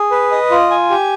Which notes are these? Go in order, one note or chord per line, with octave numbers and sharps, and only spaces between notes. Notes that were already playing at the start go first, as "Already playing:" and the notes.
Already playing: G#4
B4
D#5
F4
G#5
G4